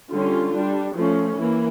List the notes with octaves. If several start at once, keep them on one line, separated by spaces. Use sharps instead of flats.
D3 G3 C#4 F4
G3 D4
F3 A3 C#4
E3 A#3